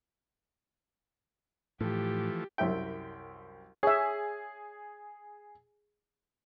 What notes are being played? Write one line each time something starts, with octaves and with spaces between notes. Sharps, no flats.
A2 E3 F3 A3 G4
C2 F#2 G4 E5 G5
G#4 C#5 E5